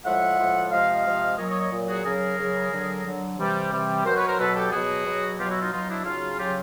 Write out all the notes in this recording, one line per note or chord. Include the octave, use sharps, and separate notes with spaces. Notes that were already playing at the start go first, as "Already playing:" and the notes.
A2 F3 G#3 E5 F#5
A2 F3 G#3
C3 F3 G#3 D#5 F5
C3 F3 G#3
A#2 F#3 C#5 D#5
C#5 D#5
C#5 D#5
A#2 F#3
F#4 G#4
C#3 F#3 G#4 A#4
C#3 F#3
D3 F#3
D3 F#3
C3 E3 G3
C3 E3 G3
B2 F#3 A#4 C5
B4 C#5
A#4 C5
B2 F#3 A4 B4
G4 A4
B2 F#3 F#4 G#4
B2 F#3
B2 F#3 F4 G4
E4 F#4
D#4 F4
B2 F#3 D#4 F4
D4 E4
C#3 F#3 D#4 F4
C#3 F#3 F4 G4